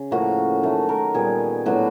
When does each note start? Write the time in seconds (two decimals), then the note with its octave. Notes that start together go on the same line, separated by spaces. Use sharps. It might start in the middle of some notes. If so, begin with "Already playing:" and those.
Already playing: C#3
0.11 A2 F3 A#3 C#4 F#4
0.63 D#3 F#3 A3
0.89 A#4
1.14 A#2 G3 B3 G#4
1.66 A2 F#3 B3 D4 F#4